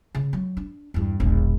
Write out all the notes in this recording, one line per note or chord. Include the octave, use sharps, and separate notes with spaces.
C#3
F#3
D4
E2 G2
E1 A#1